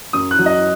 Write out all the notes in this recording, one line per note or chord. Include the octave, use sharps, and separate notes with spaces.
F#2 D#6
F#6
F#3
D#5